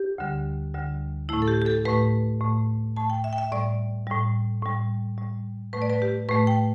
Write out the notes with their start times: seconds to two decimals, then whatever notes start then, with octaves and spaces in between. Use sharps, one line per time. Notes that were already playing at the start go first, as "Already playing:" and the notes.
Already playing: G4
0.18 D2 D3 G3
0.74 D2 D3 G3
1.29 A2 A3 E4
1.42 A4
1.48 G4
1.62 G4
1.66 A4
1.85 A2 A3 B4
2.41 A2 A3
2.97 A2 A3 A5
3.10 G5
3.24 E5
3.33 G5
3.38 E5
3.52 A2 G3 D5
4.07 A2 G3
4.62 A2 G3
5.18 A2 G3
5.73 A2 A3 B4
5.82 D5
5.90 B4
6.02 G4
6.29 A2 A3 B4
6.47 G5